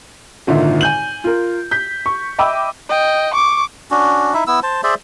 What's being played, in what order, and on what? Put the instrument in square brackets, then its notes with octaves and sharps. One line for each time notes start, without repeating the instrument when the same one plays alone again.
[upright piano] G#1 A#2 D3 D#4 F4 E5
G#5 G6 F#7
F4 A#4
G6 B6
C#6
D#5 E5 G5 B5 D6 E6
[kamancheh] D#5 G5
C#6 D6
[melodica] C#4 D4 F#4
D#4 E4 E5
B3 E4 E6
C5 A5
G#4 C5 D5 E5